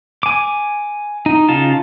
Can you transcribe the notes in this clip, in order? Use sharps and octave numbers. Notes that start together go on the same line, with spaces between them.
G#5 D6
D#4
C#3 D#4 F4 A5